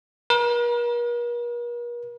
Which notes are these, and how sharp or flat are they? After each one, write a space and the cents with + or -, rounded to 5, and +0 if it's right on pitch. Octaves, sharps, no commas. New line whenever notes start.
A#4 +45